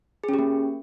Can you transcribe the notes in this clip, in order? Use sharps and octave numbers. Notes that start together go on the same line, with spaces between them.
G#4
C#4
G4
A#3